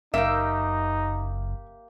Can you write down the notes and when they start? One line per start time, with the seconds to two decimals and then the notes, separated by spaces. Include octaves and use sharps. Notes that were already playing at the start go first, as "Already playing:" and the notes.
0.14 F#1 A#3 D#4 F4 G4 E5